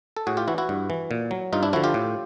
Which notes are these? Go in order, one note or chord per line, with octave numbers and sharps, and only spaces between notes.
A4
A2 F#4 G#4
F4 G4
E3 E4 F#4
E4 F#4
G2
E3
A#2
F#3
G2 D#4 F4
D4 E4
D3 F3 E4 F#4
F4 G4
A2